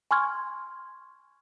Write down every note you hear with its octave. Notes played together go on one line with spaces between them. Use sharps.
G#5 C6 C#6 F6 G#6